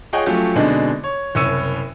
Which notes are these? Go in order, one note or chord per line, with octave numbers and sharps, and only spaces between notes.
F4 G#4 C#5 D#5 F#5 G5
F3 F#3 A3 C#4 F4 G4
B2 D3 G#3 C4 D4 D#4
C#5
F#1 C2 C#5 E6 C#7 D#7